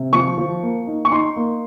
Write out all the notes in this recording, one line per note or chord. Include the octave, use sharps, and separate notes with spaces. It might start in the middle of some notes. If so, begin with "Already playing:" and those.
Already playing: C3
F3 C#6
F3
A#3
D#4
C#6
D#4 C6
A#3